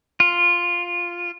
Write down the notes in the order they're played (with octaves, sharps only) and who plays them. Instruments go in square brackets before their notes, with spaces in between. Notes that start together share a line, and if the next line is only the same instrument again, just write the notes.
[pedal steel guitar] F4